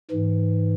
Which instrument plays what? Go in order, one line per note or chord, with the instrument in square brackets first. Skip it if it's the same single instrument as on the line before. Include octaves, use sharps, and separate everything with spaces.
[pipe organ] G#2 E3